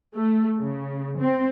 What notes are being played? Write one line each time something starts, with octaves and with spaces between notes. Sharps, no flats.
A3
C#3
C4